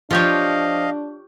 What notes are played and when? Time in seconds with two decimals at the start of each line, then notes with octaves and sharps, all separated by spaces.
0.11 F3 D4 F4 G4 C#5 D#5 F5